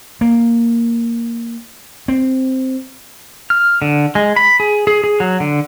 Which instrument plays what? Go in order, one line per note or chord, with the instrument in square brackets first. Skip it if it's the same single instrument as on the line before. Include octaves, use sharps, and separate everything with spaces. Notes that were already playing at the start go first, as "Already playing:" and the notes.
[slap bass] A#3
C4
[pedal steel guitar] F6
D3
G#3
B5
G#4
G#4
G#4
F#3
D3